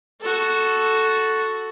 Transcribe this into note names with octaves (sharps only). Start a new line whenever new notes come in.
F#4 A4